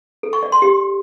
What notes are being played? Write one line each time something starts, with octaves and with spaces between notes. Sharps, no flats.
A4
C#6
D5
C6
G4